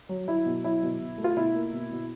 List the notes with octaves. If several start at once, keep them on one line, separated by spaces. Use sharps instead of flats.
F#3
F#3 E4
B2
F#3 E4
B2
B2
A3
F4
B2 E4
A#3
B2
B2